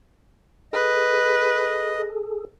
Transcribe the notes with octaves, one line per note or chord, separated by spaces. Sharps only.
G#4 A4 B4 D#5